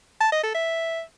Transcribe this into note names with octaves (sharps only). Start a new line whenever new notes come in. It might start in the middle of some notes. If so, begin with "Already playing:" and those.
A5
D#5
A4
E5